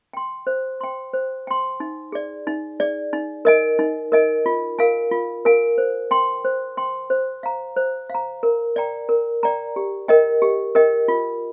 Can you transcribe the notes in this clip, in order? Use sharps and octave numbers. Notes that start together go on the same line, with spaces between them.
G5 C6
C5
G5 C6
C5
G5 C6
D#4
G#4 D5
D#4
G#4 D5
D#4
A#4 D#5 G#5
D#4
A#4 D#5 G#5
F4
A#4 F5 G#5
F4
A#4 F5 G#5
C5
G5 C6
C5
G5 C6
C5
F5 A#5
C5
F5 A#5
A#4
D5 G5 A#5
A#4
D5 G5 A#5
G4
A#4 D#5 G5
G4
A#4 D#5 G5
F4